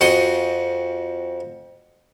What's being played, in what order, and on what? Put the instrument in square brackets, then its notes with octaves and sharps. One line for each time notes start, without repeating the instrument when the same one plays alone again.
[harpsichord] F2 F#4 C6 D#6